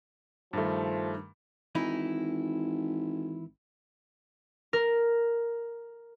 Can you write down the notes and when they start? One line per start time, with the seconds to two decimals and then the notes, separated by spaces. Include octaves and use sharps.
0.53 G2 D#3 F3 A3
1.75 G#1 E3 D#4 E4
4.73 A#4